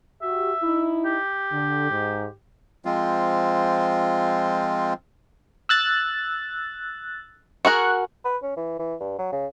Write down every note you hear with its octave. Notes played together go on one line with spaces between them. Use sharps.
F#4 G4 E5
D#4 E4
G4
D3
G#2
F3 G#3 C4 F4
E6 F#6 A6
F#4 G#4 A#4 C#6 F#6
B4
C#4
E3
E3
G2
F#3
C#3